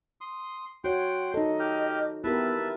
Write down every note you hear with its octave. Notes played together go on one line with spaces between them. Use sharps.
C6 D#6
F#4 C#5 F#5 G5 C6
D#4 A4 D#5
G4 F6
B3 E4 G4 A#4 B4 E5 A5